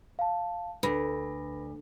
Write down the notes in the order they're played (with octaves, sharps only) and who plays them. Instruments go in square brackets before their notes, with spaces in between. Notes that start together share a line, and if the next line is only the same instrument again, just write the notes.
[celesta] F5 A5
[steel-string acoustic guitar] D2 [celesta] B4 B5 A#6